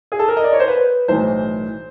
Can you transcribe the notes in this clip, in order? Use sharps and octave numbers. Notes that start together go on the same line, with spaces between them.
G#4
A4
A#4
D#5
D5
C#5
C5
B4
B1 A2 E3 C5